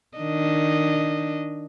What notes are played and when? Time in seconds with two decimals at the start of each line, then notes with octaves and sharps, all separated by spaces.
0.18 D#3 D4 D#5